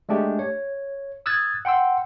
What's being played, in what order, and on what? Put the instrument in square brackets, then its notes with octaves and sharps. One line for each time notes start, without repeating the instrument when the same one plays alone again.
[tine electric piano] G#3 A3 D4 G4
C#5
D#6 E6 F#6 G#6 A6
F#5 G5 C6 E6